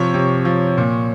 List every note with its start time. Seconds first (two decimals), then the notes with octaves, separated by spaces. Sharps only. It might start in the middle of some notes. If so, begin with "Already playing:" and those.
Already playing: C3 F3 C#5
0.14 C3
0.45 F3
0.78 A#2